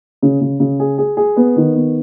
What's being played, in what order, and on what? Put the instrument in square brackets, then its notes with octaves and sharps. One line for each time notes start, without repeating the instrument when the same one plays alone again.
[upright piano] C#3
C#3
C#3
G#4
G#4
G#4
B3
D#3
B3